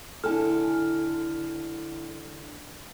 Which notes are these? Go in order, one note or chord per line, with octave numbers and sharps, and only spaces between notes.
D3 E4 A4 G#5 F6